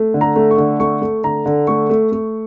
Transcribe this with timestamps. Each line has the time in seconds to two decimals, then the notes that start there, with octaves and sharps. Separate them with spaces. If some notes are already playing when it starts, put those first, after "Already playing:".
Already playing: A3
0.14 D3
0.21 A#5
0.36 A3
0.51 C#6
0.58 D3
0.80 A3 C#6
1.01 A3
1.24 D3 A#5
1.46 D3
1.67 A3 C#6
1.89 A3
2.12 A3